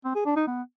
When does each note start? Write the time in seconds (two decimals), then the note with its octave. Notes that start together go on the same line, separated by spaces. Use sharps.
0.04 C4
0.15 G#4
0.26 D4
0.36 D#4
0.47 B3